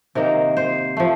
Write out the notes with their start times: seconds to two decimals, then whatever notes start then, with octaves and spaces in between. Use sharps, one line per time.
0.15 C3 D#3 A#3 D#4 A#4
0.57 C5
0.97 F3 A3